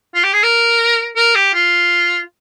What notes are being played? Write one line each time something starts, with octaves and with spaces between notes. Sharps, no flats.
F4
G4
G#4
A#4
A#4
G4
F4